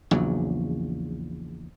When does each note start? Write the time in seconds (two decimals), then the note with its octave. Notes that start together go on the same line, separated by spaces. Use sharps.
0.11 A#1 E2 C#3 F#3